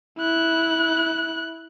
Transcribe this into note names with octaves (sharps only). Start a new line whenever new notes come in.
E4 F#6